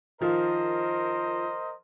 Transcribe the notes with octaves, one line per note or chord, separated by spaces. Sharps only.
D#3 F3 F4 A#4 C5 D#5